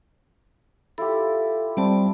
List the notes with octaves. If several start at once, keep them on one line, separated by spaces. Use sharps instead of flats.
E4 F4 G4 A4
G3 C4 D5 A5 B5